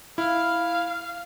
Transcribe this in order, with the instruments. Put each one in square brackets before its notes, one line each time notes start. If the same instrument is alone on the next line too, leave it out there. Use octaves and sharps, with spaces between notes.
[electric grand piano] E4 [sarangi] F5